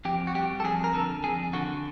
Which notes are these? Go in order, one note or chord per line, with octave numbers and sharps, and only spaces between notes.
F2 G4
F#4
G3 G4
A4
F2 G#4
A#4
D3 A4
F2 G#4
D3 F#4